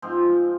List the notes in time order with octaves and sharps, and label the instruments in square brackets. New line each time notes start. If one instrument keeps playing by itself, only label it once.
[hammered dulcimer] G#2 F3 C4